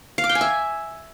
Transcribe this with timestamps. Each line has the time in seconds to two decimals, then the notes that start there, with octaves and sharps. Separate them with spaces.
0.18 F5
0.24 D6
0.29 G5
0.35 G#5
0.41 E5